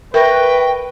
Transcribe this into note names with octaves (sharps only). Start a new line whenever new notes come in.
A#4 B4 E5 G5 C#6 A#6